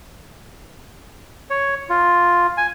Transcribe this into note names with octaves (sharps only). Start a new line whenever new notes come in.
C#5
F4
G#5